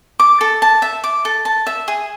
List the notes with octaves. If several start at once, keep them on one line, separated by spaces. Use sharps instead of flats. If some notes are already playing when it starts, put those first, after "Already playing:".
D6
A4
A5
E5
D6
A4
A5
E5
G#4